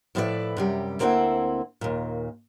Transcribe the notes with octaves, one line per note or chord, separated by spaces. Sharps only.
A2 F3 E4 A4 B4 D5
F#2 C3 G3
D2 A#3 C4 E4 C5 F#5
D#2 A#2